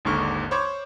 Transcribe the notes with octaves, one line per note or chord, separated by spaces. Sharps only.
G#1 D#2 G#2 D3 C#6 F6
C5 C#5 B5 C#6 D6 G#6